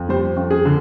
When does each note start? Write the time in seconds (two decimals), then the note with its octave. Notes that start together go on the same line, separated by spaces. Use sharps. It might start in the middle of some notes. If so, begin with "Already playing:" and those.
Already playing: F2
0.09 G3 C5
0.37 F2
0.51 G#4
0.65 D3